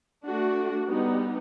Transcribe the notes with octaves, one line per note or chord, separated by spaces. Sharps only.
A3 D4 F#4
G3 B3 D#4